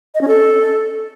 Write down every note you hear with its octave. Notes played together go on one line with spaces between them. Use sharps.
D#5
C#4
A4